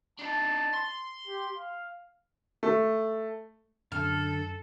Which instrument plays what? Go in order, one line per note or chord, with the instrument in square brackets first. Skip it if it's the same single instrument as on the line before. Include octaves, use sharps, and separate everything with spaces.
[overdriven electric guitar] D4 D#4 [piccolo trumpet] A5
[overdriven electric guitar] C6
[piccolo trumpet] G4
F5
[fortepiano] A3
[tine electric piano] F#2 [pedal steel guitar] D3 [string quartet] A4 [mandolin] F6